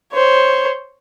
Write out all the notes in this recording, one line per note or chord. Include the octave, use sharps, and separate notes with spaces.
C5 C#5